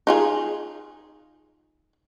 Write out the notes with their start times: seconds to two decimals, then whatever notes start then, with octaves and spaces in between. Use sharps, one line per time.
0.07 D#4 F4 G#4